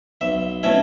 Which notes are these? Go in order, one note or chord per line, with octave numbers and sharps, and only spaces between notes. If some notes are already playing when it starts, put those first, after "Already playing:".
B1 E5
B2 A3 C#4 E4 E5